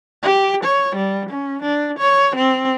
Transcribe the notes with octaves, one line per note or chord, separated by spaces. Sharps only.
G4
C#5
G3
C#4
D4
C#5
C4